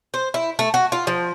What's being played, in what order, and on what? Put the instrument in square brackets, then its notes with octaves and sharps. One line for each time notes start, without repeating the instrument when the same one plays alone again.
[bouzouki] C5
E4
A3
F#4
F4
F3